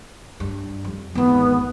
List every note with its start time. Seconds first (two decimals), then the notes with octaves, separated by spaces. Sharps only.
0.40 G2
0.84 F2
1.15 G#1 E2 B3